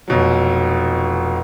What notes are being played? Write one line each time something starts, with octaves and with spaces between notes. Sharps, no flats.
F1 B2 F#3